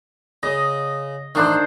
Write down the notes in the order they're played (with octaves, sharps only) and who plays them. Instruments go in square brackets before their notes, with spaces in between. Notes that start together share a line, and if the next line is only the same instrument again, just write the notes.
[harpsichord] C#3 [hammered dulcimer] D#5
[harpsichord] A1 F3 [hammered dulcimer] D#3 D4 C5